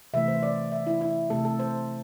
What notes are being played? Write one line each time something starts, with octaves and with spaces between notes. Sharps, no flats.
C3 E3 A3 E5
C5
D5
E5
E4
E4
C3 A3 A4
A4
C5